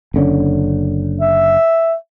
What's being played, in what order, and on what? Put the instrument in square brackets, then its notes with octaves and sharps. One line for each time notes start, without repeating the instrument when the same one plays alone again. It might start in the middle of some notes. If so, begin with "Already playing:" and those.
[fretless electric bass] F#1 D3 C#4
[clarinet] E5